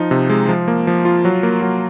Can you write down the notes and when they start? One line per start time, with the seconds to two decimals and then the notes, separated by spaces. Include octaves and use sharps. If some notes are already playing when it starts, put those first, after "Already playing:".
Already playing: F3 D#4
0.11 C3
0.30 G#3
0.49 F3
0.68 A#3
0.87 F3
1.05 F4
1.25 F#3
1.43 A#3
1.62 F#3